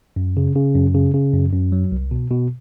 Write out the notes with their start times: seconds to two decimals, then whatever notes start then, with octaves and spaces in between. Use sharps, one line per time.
0.16 F#2
0.37 C#3
0.56 C#3
0.75 F#2
0.95 C#3
1.14 C#3
1.33 F#2
1.53 F#2
1.72 F#3
1.92 C2
2.11 B2
2.30 B2